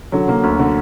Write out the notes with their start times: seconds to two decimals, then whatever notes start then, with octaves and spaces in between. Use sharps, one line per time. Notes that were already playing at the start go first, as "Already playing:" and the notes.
0.12 D3 F#3
0.28 D3 A#3
0.43 D2
0.59 D3